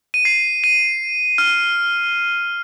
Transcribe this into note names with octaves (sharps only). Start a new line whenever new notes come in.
D#7
C7
D#7
F6